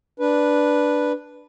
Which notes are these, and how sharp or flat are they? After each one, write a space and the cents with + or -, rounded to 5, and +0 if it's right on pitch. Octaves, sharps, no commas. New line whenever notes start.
D4 +0 B4 -5